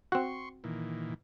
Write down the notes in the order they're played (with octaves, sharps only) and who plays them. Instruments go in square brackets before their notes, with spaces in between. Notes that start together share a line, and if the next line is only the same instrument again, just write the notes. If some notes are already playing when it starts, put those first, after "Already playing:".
[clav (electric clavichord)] C4 F#4 [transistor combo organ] C6 C#6
[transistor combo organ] A#2 D#3 E3